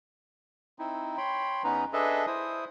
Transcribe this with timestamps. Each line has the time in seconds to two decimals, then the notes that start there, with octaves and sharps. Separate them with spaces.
0.79 C4 D#4 E4
1.17 C#5 G5 B5 C6
1.64 E2 B3 C#4 D#4 B4 A#5
1.93 D4 G#4 A4 B4 D#5 E5
2.27 E4 C5 D#6